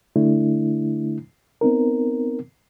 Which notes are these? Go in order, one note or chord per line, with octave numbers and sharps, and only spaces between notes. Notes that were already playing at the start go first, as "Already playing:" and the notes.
D3 A3 D4 E4
B3 C4 D#4 A#4